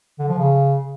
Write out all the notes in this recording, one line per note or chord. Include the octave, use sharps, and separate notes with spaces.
D3
F3
C#3